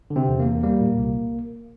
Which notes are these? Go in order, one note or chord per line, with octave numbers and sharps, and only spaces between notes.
D3
C3 C4
E2
A#3
E2
G3 A#3
A#2
C2